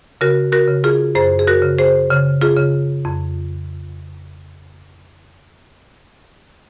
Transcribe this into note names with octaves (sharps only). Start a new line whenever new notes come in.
C#3 F#4 A#4
F#4 A#4
C#3
F4 G#4
F#2 G#4 C5
G#4
F#4 A#4
C#3
G#4 C5
C#3
F4 G#4
C#3
F2